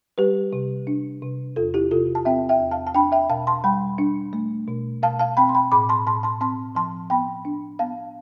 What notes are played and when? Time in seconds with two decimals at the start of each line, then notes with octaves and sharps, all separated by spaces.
0.18 G3 G4 B4
0.53 C3
0.87 D4
1.22 C3
1.56 E2 F4 A4
1.74 E4 G4
1.91 C3 F4 A4
2.15 A5
2.25 C4 E5 G5
2.49 E5 G5
2.60 E2
2.71 F5 A5
2.87 A5
2.95 D4 G5 B5
3.12 E5 G5
3.29 B2 F5 A5
3.47 A5 C6
3.64 G3 G5 B5
3.98 D4
4.33 A3
4.68 B2
5.03 B2 F5 A5
5.19 F5 A5
5.37 C4 G5 B5
5.49 C6
5.55 G5 B5
5.71 A2 B5 D6
5.89 A5 C6
6.06 A2 A5 C6
6.23 A5 C6
6.41 C4 A5 C6
6.75 F3 A5 C6
7.10 B3 G5 B5
7.45 D4
7.79 B3 F5 A5